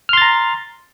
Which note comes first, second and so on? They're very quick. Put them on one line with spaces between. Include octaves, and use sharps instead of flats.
F6 C6 A6 A#5